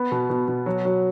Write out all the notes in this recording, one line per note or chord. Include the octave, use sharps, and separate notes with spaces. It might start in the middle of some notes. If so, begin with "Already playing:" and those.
Already playing: B3
B2
B2
B2
F#3
F#3